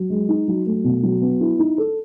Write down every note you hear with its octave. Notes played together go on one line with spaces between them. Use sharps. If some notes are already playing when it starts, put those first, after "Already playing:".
Already playing: F#3
G#3
D#4
F#3
A3
B2
F#3
B3
E4
D#4
A4